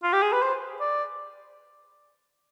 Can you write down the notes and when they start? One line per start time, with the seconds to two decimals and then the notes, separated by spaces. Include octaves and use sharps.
0.03 F4
0.13 G4
0.22 G#4
0.32 B4
0.42 C5
0.80 D5